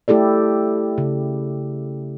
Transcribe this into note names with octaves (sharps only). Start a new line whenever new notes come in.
A3 E4 G4 A4 D5
C#3